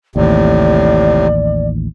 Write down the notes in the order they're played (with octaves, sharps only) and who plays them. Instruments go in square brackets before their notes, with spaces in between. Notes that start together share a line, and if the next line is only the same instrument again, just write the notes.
[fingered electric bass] A1 D#2 [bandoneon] A2 C3 [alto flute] D5